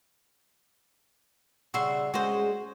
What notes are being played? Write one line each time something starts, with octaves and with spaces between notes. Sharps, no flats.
C#3 G3 F#4 E5 C6
G#3 C#4 F#4 G#4 C5